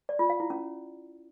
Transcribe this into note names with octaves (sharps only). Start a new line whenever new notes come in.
D5
F4
F5
E4
C#4